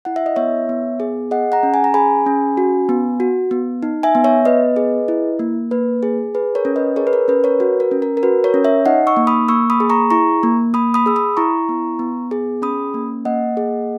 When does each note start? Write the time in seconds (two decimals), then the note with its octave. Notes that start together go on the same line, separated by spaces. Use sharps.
0.05 E4 F#5
0.16 E5
0.26 D#5
0.36 B3 C#5 E5
0.69 B3
1.00 G#4
1.31 G#4 D#5 F#5
1.52 F#5 A#5
1.63 C#4
1.74 G#5
1.84 A#5
1.94 G#4 G#5 B5
2.26 C#4
2.57 F#4
2.89 B3
3.20 F#4
3.51 B3
3.83 D#4
4.03 E5 G#5
4.15 B3
4.24 C#5 E5
4.45 B3 B4 D#5
4.76 G#4
5.08 E4
5.39 A#3
5.71 A#3 B4
6.03 G#4
6.35 G#4 B4
6.55 A#4 C#5
6.65 C#4
6.76 B4 D#5
6.96 G#4 A#4 C#5
7.07 B4
7.13 A#4
7.28 C#4 B4
7.44 A#4 C#5
7.60 F#4 B4
7.80 A#4
7.91 C#4
8.02 A#4
8.17 A#4
8.23 F#4 B4
8.44 A#4 C#5
8.54 C#4
8.65 C#5 E5
8.86 D#4 D#5 F#5
9.07 C#6 E6
9.17 A#3
9.27 B5 D#6
9.48 A#3 C#6 E6
9.70 B5 D#6
9.80 G#4
9.90 A#5 C#6
10.11 E4 A#5 C#6
10.43 A#3
10.74 A#3 B5 D#6
10.94 B5 D#6
11.06 G#4 E6
11.16 B5 D#6
11.37 E4 A#5 C#6
11.69 B3
11.99 B3
12.31 G#4
12.62 C#4 B5 D#6
12.94 A#3
13.25 A#3 D#5 F#5
13.57 G#4